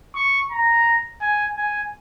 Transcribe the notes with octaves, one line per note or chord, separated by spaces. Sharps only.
C#6
A#5
G#5
G#5